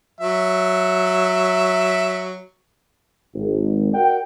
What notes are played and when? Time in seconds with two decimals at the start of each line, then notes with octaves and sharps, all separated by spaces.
0.20 F#3 E5
3.34 G#1
3.93 F#4 A#4 D5 F#5 G5